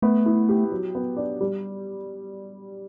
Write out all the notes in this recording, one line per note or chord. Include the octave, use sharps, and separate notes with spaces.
A3 B3
E4
G4
F#3
B3
D4
G3